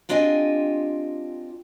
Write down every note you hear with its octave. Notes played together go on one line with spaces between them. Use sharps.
C4 D4 F4 G4 D#5 G#5